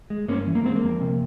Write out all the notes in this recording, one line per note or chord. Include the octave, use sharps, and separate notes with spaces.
G#3
G2 A#3 C#4
E3
A#3
G#3 C4
A#3
F2
C3